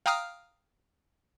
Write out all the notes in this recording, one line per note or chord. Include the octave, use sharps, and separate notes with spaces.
F5 G5 A#5 D#6 F6